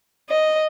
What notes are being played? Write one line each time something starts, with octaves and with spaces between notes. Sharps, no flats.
D#5